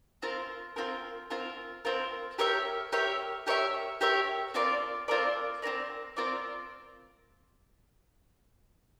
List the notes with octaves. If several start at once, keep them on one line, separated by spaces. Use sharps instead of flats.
C4 F4 A#4
C4 F4 A#4
C4 F4 A#4
C4 F4 A#4
G4 A#4 C#5 E5
G4 A#4 C#5 E5
G4 A#4 C#5 E5
G4 A#4 C#5 E5
C4 F4 A#4 D5
C4 F4 A#4 D5
C4 F4 A#4 D5
C4 F4 A#4 D5